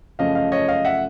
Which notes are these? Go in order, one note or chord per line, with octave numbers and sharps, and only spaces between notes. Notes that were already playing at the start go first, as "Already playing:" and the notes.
F#2 C#3 F3 A3 C#4 D#5 F5
D#5 F5
C#5 D#5
D#5 F5
E5 F#5